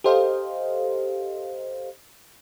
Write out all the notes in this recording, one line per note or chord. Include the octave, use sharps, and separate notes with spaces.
G4 A4 C5 D#5 F5